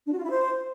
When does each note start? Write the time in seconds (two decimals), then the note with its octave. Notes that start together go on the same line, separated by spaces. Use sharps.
0.05 D4
0.11 F#4
0.17 F4
0.23 E4
0.29 C5